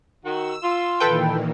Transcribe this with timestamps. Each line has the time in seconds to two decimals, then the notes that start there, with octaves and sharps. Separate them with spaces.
0.25 D#3 F#4 E6
0.62 F4
1.00 A#2 D#3 E3 A4 B4 G5